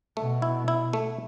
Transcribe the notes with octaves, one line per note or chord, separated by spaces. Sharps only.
B2 A3
E4
E4
A3